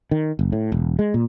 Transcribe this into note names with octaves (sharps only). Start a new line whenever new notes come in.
D#3
F#1
A2
E1
G#3
A#2